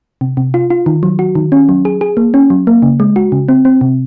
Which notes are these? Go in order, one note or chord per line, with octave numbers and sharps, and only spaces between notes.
C3
C3
F4
F4
D#3
F#3
F#4
D#3
C#4
F#3
G#4
G#4
A#3
C#4
F#3
A#3
C#3
G#3
F#4
C#3
C4
C4
C3